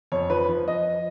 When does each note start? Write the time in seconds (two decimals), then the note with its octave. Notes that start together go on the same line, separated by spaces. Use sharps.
0.12 F2 C#5
0.30 F3 B4
0.49 F3
0.67 F3 D#5